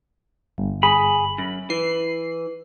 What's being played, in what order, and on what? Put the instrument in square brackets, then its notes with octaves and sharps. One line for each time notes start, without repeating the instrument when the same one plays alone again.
[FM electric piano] G1
[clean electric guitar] G#4 [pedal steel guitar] B5
[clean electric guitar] F#2
[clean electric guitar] E3 [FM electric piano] C7